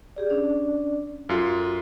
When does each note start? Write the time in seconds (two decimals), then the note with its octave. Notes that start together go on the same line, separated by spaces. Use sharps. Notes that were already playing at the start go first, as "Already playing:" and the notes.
0.16 G4 G#4 D5
0.30 C#4 D4 D5
1.29 F#2 F4 F#4 A4